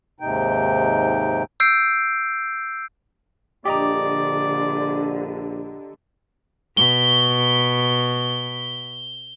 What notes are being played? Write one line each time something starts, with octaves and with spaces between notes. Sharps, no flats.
D#2 G#2 C3 D#4 G5
E6 G6 C7 D7
A#1 D3 G4 D5 D#5 A#5
B2 G7